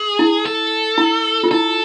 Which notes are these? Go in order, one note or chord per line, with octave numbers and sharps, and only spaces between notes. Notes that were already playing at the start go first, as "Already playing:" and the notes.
Already playing: G#4
E4
A4
E4
F4
E4 A4